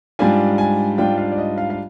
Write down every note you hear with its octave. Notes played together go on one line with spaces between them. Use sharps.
G#2 G3 D4 F4 G#5
G#5
G#2 G3 D4 F4 G5
F5
D5
D#5
F5
F5